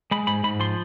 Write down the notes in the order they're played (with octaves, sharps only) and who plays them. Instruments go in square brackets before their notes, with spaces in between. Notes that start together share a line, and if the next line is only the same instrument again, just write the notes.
[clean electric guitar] G#3 B5
G#2 B5
G#2 B5
F3 C6